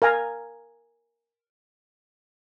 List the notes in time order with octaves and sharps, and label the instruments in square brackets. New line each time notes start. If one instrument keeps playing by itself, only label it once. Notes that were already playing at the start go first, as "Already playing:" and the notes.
[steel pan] A#4 F5 G#5 A#5